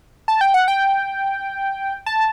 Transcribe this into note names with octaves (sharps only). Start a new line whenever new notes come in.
A5
G5
F#5
G5
A5